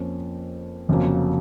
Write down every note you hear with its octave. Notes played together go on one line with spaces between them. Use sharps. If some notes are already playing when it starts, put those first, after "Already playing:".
Already playing: F2 F3 A#3 C#4
F1 F2 C#3 F#3 A#3